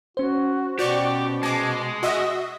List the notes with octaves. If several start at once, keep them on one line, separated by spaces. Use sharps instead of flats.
C#4 F#4 C5
B2 F#4 G4 D5 C#6
G#3 A5 D6
F#4 D#5 E5